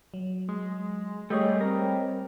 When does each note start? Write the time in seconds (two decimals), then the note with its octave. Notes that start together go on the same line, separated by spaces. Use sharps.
0.14 F#3
0.48 G#3
1.30 G3 A3 G#4 C#5 D#5 G5
1.61 C4 A#4